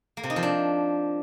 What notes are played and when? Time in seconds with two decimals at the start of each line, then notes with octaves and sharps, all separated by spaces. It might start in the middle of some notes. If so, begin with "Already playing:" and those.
0.17 A#3
0.23 C3
0.30 D#4
0.36 F3
0.43 D4